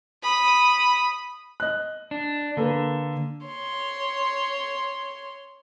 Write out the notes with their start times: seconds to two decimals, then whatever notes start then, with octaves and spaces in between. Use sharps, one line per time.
0.22 B5 D#6
1.60 D#5 F#6
2.11 D4
2.57 D3 A#3 A4 B4
3.45 C#5 C6